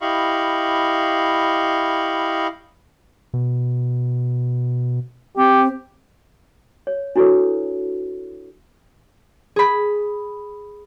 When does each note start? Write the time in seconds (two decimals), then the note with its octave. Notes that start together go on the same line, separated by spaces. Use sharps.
0.01 E4 G4 D#5 F5 B5 C#6
3.34 B2
5.37 C4 G4
6.87 C#5
7.16 D4 E4 F#4 A4 B4 C#5
9.56 G#4 B5